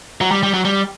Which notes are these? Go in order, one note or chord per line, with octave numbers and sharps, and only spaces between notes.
F#3
G3
G3
F#3
G3